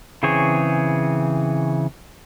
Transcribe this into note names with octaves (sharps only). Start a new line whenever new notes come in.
C#3 E3 C4 G#4 C#5